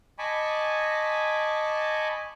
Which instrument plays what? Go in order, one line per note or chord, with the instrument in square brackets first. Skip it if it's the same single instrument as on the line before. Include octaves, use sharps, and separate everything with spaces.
[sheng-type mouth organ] D#5 G#5 A5 B5 C#6 D6